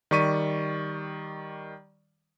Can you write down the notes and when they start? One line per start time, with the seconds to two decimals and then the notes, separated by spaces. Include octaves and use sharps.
0.11 D#3 G3 D5 C#6 B6 D#7